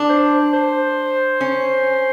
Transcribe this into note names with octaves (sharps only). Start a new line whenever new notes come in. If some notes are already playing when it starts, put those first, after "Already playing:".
Already playing: D4
C5
C5
C#4